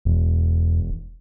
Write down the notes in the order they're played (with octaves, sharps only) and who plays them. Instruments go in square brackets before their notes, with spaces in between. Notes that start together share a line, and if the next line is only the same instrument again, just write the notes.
[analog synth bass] E1 [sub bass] E2